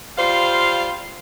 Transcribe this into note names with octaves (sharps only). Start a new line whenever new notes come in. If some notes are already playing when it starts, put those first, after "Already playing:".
G3 F4 C5 F5